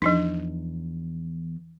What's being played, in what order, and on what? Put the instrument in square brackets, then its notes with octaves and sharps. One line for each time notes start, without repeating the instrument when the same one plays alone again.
[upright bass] E2 [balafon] F3 D4 D#4